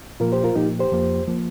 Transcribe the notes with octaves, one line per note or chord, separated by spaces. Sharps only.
A#2 F3 A#3 F4 A#4
G4 C5
F4 A#4
A#2 F3 A#3 D#4 G4
G4 C5
F2 F3 A#3
F3 A#3